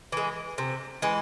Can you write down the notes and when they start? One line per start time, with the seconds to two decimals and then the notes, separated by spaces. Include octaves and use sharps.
0.12 E3 G#3
0.58 C3
1.02 E3 G#3